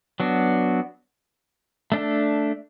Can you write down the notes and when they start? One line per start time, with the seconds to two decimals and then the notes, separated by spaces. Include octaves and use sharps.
0.20 F#3 B3 D4 F#4
1.92 A3 D4 A4